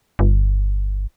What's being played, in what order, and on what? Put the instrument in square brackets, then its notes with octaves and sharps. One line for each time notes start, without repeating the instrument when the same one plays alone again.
[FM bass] G1